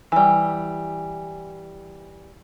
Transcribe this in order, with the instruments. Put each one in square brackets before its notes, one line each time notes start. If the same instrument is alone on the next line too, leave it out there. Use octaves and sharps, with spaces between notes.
[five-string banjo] E3 G3